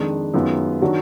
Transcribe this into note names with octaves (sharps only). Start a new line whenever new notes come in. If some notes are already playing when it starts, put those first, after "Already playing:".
Already playing: F2 D#3 G#3 D4
F#2 D#3 G#3 B3 F4
D#3 F#3 D4 F#4